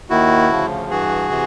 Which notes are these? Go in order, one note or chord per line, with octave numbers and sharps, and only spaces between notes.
D#2 D#3 E4 F#4
D2 C#3 F3
G2 E3 F#4 G#4
C3 E3